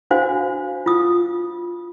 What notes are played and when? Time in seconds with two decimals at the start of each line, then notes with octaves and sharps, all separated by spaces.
0.11 D4 F#4 C5 F5 G#5
0.86 F4 D#6